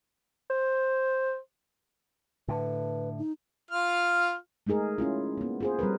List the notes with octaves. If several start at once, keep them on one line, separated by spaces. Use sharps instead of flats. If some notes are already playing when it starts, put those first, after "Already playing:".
C5
A2 D3 B4
D#4
F4 F6
G#3 A3 D#4 G#4 A#4
C#4 E4 F4
A#3 B3
F4 G#4 C5
G3 C4 A#4 B4